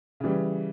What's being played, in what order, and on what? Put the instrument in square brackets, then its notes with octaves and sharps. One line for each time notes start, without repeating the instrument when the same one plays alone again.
[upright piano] C#3 E3 G3